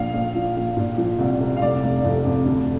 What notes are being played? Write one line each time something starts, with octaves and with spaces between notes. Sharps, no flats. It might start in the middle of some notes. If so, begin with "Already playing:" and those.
Already playing: A#1 F5
A#1
F3
A#1
A#2
F3
C2
C2
F5
F1 D5
F1
F2
F2
D2